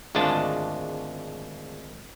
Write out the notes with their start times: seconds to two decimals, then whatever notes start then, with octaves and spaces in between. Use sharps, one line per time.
0.15 G#1 D2 G#3 D4 F4 A5